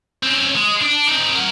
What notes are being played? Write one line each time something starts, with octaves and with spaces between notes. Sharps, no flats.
C4 C#4
G#3
D4
C4 D#4
A#4 F#5